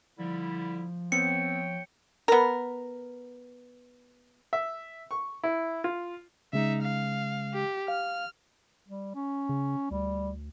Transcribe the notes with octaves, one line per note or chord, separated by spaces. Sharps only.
D3 F3 G3 E4
B3 C4 C#5 G5 C#7
B3 A#4
E5
C#6
E4
F4
C#3 G#3 D#4 E5
F5
G4
F5 F6
G3
C#4
C#3
D2 G3